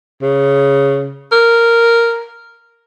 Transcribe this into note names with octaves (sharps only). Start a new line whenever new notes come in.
C#3
A#4